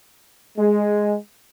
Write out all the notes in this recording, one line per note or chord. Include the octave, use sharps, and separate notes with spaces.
G#3